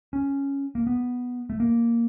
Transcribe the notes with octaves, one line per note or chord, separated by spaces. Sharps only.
C#4
A#3
B3
A3
A#3